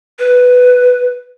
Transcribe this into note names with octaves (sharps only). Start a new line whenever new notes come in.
B4